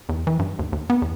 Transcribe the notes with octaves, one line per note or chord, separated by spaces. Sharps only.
E2
E3
G2
D#2
D#2
B3
E2